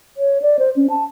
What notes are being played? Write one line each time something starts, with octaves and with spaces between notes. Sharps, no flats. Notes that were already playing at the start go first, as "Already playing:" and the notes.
C#5
D5
C5
C#4
A5